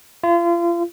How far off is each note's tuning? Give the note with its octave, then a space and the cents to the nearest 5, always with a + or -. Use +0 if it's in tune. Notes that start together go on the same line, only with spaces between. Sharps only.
F4 -35